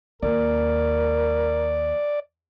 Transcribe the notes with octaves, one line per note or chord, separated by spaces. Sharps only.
D#2 A#4 D5